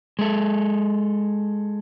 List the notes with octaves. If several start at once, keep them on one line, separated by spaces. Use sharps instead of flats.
G#3 A4